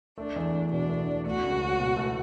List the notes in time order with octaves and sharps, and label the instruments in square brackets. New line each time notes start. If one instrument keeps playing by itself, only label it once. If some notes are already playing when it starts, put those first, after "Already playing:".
[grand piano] A3 [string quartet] D4
[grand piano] E2
E2
[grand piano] B2 [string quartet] D4
[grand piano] A3
E2
[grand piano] A3 [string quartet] F#4
[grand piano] C#2
C#4
B2
A3